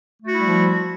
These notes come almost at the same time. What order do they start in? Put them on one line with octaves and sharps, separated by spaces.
A3 F#4 E4 G3 F3